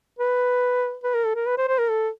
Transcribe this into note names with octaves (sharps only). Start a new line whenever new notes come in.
B4
B4
A#4
A4
A#4
B4
C5
C5
A#4
A4